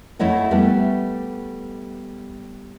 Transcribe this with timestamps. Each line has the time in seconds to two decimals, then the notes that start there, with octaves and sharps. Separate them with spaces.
0.19 F2 A3 E4 C#5 D#5 F#5
0.51 G3 A3 B3 A4